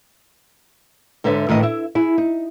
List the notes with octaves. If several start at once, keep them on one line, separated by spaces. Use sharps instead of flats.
G#2 D3 B4 C#5 E5
A2 D#3 E3 D#5
E4 E5
E4 G#4
D#4